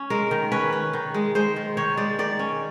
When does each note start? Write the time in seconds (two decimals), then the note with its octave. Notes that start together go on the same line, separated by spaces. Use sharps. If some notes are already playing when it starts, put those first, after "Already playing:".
Already playing: C#4
0.10 G#3 A#4
0.31 D#3
0.52 C#4 B4
0.73 C#4
0.93 D#3
1.14 G#3
1.35 G#3 C5
1.56 D#3
1.77 D#3 C#5
1.97 G#3 D5
2.19 D#3 D5
2.39 C#4